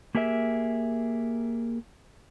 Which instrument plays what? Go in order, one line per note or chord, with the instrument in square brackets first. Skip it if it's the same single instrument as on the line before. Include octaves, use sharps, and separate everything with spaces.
[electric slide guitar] A#3 G4 G#4 A#4 E5